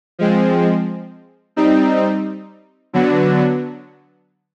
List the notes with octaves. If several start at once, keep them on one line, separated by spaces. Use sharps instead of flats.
F3 G#3 C4
G3 C4 D#4
D3 F#3 B3 D4 F#4